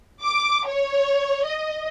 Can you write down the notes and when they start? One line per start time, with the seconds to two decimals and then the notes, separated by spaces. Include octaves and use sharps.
0.23 D6
0.66 C#5
1.45 D#5